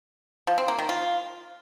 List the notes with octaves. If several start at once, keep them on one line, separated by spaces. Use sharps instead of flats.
F3
C4
A#3
D#3
F4